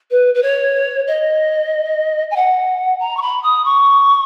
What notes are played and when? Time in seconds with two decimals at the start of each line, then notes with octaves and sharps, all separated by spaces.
0.11 B4
0.35 B4
0.43 C#5
1.07 D#5
2.31 G#5
2.36 F#5
3.00 A#5
3.17 C#6
3.22 B5
3.43 D#6
3.65 C#6